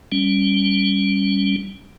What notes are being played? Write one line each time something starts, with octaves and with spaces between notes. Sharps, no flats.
G3 C#4